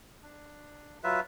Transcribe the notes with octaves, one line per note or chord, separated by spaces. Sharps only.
D4
F#3 F4 B4 E5